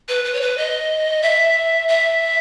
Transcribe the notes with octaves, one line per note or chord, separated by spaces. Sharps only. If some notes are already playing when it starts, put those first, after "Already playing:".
B4
B4
C#5
B4
D#5
E5
E5